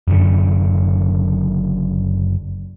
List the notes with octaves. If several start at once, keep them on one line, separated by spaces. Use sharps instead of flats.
F#1 F#2 B2 D3